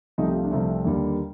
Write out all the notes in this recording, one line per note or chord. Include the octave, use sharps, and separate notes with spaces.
C2 C3 F3 A3 D#4
G4
F4
D4
C2 C3 F3 A3 C4
D#2 D3 G3 A#3